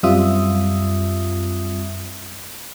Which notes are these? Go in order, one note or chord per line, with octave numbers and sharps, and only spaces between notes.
F#2 G3 C4 F4 E5 D#6